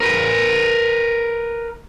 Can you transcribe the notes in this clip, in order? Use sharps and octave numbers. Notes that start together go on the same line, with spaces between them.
A#4 B4